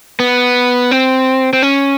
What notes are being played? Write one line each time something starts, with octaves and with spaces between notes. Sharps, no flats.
B3
C4
C4
C#4